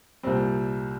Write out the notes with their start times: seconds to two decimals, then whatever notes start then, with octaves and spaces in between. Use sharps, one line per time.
0.23 C2 A#2 G3 C4